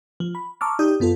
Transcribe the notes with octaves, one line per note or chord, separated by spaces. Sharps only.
F3
B5
A5 A#5 C#6 D6 E6 F6
D#4 G4 D5 D#6 G6
F#2 B3 F4 A4